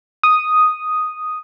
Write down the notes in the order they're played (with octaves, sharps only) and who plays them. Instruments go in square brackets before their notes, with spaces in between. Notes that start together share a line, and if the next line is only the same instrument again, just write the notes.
[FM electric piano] D#6